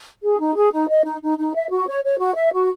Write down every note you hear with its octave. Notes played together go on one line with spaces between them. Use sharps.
G#4
D#4
G#4
D#4
D#5
D#4
D#4
D#4
E5
F#4
C#5
C#5
F#4
E5
F#4